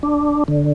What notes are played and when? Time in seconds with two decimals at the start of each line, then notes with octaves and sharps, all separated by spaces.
0.03 D4
0.48 D3